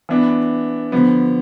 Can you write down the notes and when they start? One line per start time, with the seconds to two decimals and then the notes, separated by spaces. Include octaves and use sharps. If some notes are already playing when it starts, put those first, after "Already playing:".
0.09 E3 B3 D4
0.92 D3 F3 B3